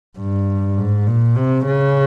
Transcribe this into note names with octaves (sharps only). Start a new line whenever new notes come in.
G2
G#2
A#2
C3
C#3